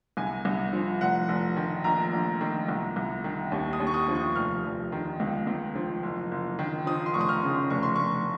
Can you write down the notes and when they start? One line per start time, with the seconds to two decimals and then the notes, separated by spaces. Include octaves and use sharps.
0.17 C2 G#5
0.45 C2
0.73 F3
1.01 F1 F#5
1.28 F1
1.56 D#3
1.84 A#1 A#5
2.13 A#1
2.41 D#3
2.68 C2
2.96 C2
3.24 D#3
3.52 D#2
3.73 D#6
3.80 D#2
3.87 C#6
3.94 D#6
4.08 F3
4.15 C#6
4.36 F1 F6
4.64 F1
4.92 D#3
5.20 C#2
5.47 C#2
5.75 F3
6.03 F#1
6.31 F#1
6.59 D#3
6.87 F3 D#6
7.06 C6
7.14 F1 C#6
7.21 D#6
7.29 F6
7.43 C#3
7.70 F1 C#6
7.83 C6
7.96 F1 C#6